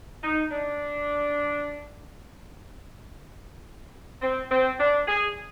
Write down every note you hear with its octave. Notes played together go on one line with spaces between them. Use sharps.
D#4
D4
C4
C4
D4
G#4